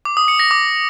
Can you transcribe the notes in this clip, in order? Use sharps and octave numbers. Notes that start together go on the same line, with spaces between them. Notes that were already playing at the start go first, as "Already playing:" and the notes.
D6
D#6
C#7
A#6
D6